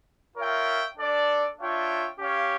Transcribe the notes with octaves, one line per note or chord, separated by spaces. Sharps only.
F4 A#4 C#5 E5 G5
D4 A4 D5
D4 F4 C#5 E5 G5
C#4 G4 C#5 F5